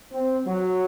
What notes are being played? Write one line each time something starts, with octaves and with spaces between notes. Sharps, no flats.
C4
F#3